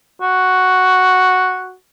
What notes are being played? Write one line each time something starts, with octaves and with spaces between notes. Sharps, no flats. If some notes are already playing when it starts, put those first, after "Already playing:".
F#4